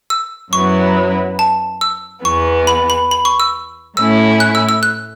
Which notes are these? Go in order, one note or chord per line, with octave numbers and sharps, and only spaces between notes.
E6
F#2 F#3 B3 E4 C#6
A5
E6
E2 E3 B3 C#6
B5
B5
B5
C#6
E6
A2 A3 C#4 E4 E6
F#6
E6
E6
F#6